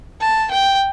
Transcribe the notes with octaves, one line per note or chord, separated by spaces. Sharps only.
A5
G5